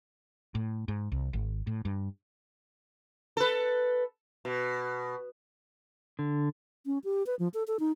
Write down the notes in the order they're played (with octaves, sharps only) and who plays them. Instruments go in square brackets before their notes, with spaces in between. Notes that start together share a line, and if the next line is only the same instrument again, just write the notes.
[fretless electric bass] A2
G#2
C2
G#1
A2
G2
[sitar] A4 B4
B2
[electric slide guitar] D3
[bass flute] C#4
G4
B4
F3
A4
A4
D#4